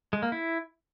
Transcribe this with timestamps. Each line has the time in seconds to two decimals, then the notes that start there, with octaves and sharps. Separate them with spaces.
0.13 G#3
0.23 A#3
0.32 E4